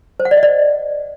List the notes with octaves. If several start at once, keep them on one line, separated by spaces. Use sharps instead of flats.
C5
F#5
D5
D#5
D5